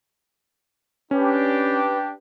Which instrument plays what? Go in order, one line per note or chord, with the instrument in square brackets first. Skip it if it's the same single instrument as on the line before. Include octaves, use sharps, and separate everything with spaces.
[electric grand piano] C#4 [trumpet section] D4 G4 [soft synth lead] B4